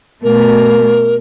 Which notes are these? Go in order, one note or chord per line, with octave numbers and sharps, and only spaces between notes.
B2 A3 A#4